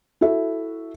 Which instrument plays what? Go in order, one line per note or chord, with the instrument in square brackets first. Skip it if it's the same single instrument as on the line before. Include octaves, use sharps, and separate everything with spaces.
[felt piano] E4 F#4 A4 E5